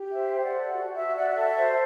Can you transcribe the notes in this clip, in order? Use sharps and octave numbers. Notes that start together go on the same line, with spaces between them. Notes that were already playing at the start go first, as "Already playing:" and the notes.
Already playing: G4
C5 E5
C5
D5 F#5
A4
F#4
F#4 E5
F#4 D5 F#5
F#5
A4 E5
C5